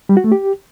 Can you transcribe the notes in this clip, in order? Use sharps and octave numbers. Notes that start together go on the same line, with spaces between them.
G3
F#4
A3
G4